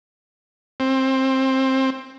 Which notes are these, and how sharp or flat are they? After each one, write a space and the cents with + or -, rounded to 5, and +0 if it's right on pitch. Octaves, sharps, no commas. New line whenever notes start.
C4 +20